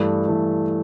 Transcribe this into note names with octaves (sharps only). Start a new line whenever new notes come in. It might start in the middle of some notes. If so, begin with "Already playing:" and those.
Already playing: G2 E3 A3
G2 E3 A3